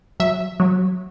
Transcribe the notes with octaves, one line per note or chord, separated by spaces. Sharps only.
F#3 E5
F#3